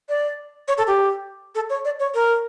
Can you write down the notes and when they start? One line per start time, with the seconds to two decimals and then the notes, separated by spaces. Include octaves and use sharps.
0.09 D5
0.68 C#5
0.78 A4
0.87 G4
1.55 A4
1.70 C#5
1.85 D5
1.99 C#5
2.14 A#4